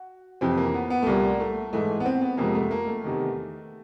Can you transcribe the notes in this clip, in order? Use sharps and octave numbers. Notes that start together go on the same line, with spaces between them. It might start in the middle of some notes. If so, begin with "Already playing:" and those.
Already playing: F#4
F2 C3 E3 C4
A#3
B3
B3
A3
C2 A#2 G3 A#3
A3
G#2 E3 G#3 A3
B3
C4
B3
F2 C3 F3 G#3 A#3
A3
A#3
A3
E2 C3 D#3